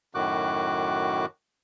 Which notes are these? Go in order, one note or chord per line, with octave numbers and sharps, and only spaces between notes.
F#2 A2 D#3 F#4 D6 F#6